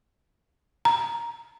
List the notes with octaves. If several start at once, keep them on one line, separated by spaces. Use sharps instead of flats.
A#5